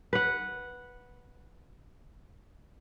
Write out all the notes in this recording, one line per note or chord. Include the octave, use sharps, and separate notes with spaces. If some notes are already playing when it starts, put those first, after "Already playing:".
B4 F#5